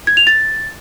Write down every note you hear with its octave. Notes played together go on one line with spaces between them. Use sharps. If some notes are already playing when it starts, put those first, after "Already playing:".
G#6
F7
A6